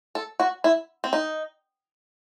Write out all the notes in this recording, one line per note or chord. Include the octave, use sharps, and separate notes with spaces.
A4
F#4
E4
C4
D#4